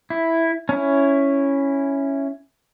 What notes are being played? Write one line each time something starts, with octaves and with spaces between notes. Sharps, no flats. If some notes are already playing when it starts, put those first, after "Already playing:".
E4
C#4 E4